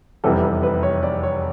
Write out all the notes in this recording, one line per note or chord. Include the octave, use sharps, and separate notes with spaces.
F1 E2 C3 E3 G3 A4
B4
B4
C#5
D5
C#5